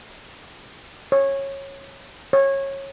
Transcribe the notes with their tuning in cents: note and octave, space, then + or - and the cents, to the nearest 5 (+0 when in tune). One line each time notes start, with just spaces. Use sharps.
C#5 -15
C#5 -20